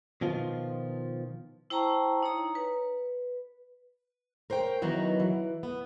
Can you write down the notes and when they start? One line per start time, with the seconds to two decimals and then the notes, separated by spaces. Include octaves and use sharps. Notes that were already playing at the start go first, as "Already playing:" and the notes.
0.21 B2 D#3 F3 F4
1.70 E4 C5 G5 A5 A#5 C#6
2.23 D#4 C#5 A#5
2.55 B4
4.50 A#4 C5 C#5 G5
4.82 D#3 E3 F#3 B3 D#4 F#4
5.20 E3
5.63 B3